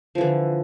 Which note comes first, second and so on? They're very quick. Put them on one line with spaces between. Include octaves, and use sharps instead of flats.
F3 E3 D3